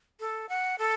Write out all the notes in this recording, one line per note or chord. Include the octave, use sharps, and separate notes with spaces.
A4
F#5
A4